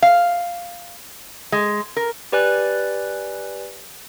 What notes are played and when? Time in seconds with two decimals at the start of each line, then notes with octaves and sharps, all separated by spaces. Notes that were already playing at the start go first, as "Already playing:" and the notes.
0.02 F5
1.52 G#3
1.96 A#4
2.32 G4 B4 D5 G#5 F#6 A6